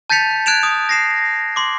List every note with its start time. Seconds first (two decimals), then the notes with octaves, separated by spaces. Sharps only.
0.10 A5 G6 A6 B6 C#7 F7
0.46 F#6 G#6 D7 E7 F7
0.63 D#6
0.89 A#6 C7 E7
1.56 C6 D6